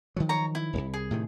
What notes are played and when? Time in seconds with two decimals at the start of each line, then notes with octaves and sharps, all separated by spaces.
0.16 D#3 F3 F#3
0.29 C#5 A#5
0.55 E4
0.73 D1 C2
0.94 G#4
1.11 A2 C3 D#3